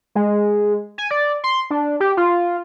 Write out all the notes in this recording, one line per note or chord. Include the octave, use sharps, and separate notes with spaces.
G#3
G#5
D5
C6
D4
G4
F4